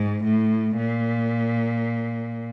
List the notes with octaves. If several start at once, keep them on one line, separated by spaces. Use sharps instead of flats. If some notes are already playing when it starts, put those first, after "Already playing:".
Already playing: G#2
A2
A#2